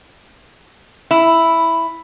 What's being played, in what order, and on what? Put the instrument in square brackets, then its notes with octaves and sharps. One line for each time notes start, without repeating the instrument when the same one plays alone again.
[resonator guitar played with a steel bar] E4